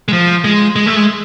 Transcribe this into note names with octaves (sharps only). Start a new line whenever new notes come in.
G#3
F3
G#3
G#3
A3
G#3